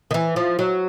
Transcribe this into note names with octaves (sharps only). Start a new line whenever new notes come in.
D#3
E3
F3
F#3